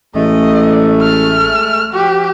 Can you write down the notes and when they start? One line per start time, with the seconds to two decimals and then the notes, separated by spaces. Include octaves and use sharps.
0.16 A1 G#3 A3 D#5
1.01 F6
1.93 F3 F#4 G4